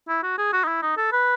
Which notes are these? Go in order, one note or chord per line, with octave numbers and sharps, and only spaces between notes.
E4
F#4
G#4
F#4
D#4
E4
D#4
A4
B4